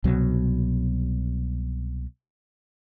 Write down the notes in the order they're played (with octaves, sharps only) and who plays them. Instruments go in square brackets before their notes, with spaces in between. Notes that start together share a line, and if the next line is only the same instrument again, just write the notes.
[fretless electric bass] C2 B2 F#3